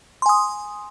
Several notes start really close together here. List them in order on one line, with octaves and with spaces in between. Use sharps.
C6 G#5 D#6